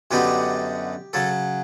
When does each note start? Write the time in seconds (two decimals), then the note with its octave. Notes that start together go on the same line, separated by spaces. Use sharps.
0.11 F#2 D3 G3 B3 D#4 G4
1.13 C#3 F#3 A4